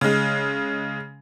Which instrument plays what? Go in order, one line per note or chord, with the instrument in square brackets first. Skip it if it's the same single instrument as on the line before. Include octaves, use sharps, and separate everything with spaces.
[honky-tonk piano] C#3 G#3